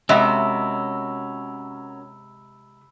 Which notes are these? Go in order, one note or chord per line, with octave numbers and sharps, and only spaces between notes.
C3 G#3 C#4 F#4 A#4 E5 B5 E6